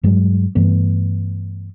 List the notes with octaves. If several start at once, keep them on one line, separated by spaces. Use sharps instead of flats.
G2 F#3 G#3
G2 E3 A3 B3